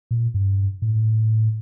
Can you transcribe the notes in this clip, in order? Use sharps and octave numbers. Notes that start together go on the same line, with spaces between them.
A#2
G2
A2